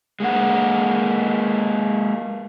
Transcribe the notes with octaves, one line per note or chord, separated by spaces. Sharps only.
G#3 A#3 F#5